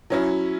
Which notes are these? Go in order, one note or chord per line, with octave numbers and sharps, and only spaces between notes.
F#3 C#4 E4